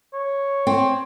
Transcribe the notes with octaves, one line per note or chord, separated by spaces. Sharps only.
C#5
C4